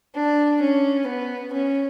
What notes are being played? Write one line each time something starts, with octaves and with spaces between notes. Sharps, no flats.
D4
C#4
B3
C#4